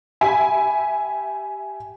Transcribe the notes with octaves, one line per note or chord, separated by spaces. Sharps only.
G4 E5 G#5 B5